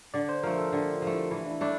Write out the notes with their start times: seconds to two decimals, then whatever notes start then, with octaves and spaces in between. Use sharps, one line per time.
0.14 D3 D5
0.29 C5
0.43 F3 A#4
0.47 A3
0.58 A4
0.72 D3 G4
0.92 F4
1.02 F3 A3
1.12 E4
1.31 E3 E4
1.46 D4
1.51 E4
1.61 A3 D4 E4